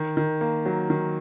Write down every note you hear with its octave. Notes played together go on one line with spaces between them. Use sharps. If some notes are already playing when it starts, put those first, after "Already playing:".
Already playing: D#3
D#3
A#3
F#3
D#3